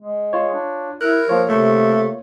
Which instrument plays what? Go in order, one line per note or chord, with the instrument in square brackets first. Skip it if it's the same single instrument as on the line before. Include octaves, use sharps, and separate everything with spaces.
[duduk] G#3
[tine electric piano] F4 C#5
[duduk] D4
[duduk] E4 [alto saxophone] A#4 [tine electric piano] F#6
[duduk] F3 [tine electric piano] A#3 F4 C#5
[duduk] C3 [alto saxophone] A3